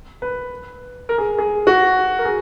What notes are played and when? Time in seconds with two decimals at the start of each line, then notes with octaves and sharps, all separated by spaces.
0.22 B4
1.09 A#4
1.18 G#4
1.38 G#4
1.67 F#4
2.19 A#4
2.25 G#4